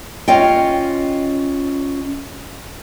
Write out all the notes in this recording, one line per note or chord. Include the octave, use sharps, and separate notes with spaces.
C#4 F4 D#5 G5